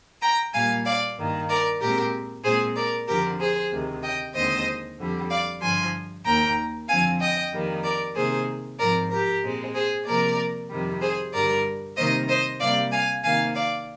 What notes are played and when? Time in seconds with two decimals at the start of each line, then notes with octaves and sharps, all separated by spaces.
0.21 G5 A#5
0.53 A#2 G3 A#3 F5 G#5
0.85 D5 F5
1.17 G2 D#3 A#3
1.49 A#4 D5
1.80 A#2 G#3 C4 G4 A#4
2.44 A#2 G#3 C4 G#4 C5
2.75 A#4 D5
3.07 F2 D3 F3 G4 A#4
3.39 G#4 C5
3.71 D2 C3 D#3
4.02 D#5 G5
4.34 D#2 D3 G#3 C4 C5 D#5
4.98 F2 D3 G3
5.30 D5 F5
5.61 G2 D3 F3 G#5 C6
6.25 D#2 D#3 A#3 G5 A#5
6.88 F2 D3 F3 C4 F5 G#5
7.20 D#5 G5
7.52 F2 D#3 G3 A#3
7.83 A#4 D5
8.15 C3 D#3 A#3 G#4 C5
8.78 G#2 F3 C4 A#4 D5
9.10 G4 A#4
9.42 A#2 G#3 C4
9.74 G#4 C5
10.06 C3 F3 A#3 A#4 D5
10.69 F2 C3 D#3 G3
11.01 G#4 C5
11.32 G2 D3 G3 A#4 D5
11.96 C3 D#3 G3 A#3 C5 D#5
12.28 C5 D#5
12.59 C3 G3 A#3 D5 F5
12.92 F5 G#5
13.23 C3 D#3 A#3 F5 G#5
13.55 D5 F5